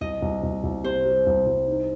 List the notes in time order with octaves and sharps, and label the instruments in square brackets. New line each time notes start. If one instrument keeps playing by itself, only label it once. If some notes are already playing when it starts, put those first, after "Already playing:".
[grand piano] C2 [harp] D#5
[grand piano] C2
C2
C2
[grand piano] C3 [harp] C5
[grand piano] G3
C2
C2
D#4